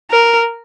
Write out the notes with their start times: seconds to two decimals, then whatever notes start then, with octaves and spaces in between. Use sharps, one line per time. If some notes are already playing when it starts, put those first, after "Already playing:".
0.10 A#4